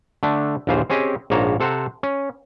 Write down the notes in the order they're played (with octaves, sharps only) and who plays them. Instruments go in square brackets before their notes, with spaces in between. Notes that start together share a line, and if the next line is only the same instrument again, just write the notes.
[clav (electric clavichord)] D3 A3 D4
A#1 D#2 E3 F4 C5
C4 C#4 G4 G#4 D#5
A#1 G#2 A#3 C#5 A5 A#5
C3 A4 C5 F#5 A#5
C#4